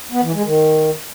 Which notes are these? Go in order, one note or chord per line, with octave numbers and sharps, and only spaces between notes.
B3
E3
G#3
D#3